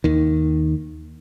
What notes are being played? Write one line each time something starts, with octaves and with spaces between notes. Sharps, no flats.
D#2 D#3